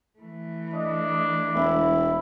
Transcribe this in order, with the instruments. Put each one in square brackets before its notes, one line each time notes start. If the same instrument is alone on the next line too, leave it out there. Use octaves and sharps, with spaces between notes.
[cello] E3 A3
[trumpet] D4 [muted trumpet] D#5
[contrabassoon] E1 [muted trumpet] E4